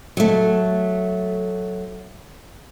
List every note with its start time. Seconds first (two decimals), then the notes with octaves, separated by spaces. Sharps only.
0.17 F#3 A3